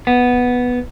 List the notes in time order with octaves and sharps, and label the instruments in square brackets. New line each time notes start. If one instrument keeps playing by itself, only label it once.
[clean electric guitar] B3